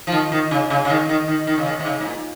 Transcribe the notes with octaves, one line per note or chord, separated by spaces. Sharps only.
F3
D#3
D#3
C#3
C#3
C#3
D#3
D#3
D#3
D#3
C#3
D#3
C3
C#3
G#2
A#2